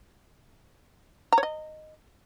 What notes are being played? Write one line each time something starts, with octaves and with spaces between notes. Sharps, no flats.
A#5
C#5
D#5